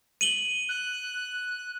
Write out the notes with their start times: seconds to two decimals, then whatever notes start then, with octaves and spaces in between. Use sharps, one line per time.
0.21 D#7 F#7 G7
0.69 F#6